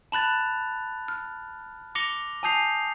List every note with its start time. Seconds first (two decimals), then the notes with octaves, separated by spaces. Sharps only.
0.12 A5 B5 F#6 A6 F7
1.08 F6
1.95 D6 A#6 C#7 F7 G7
2.43 G#5 A5 D#6 G6 C7 F7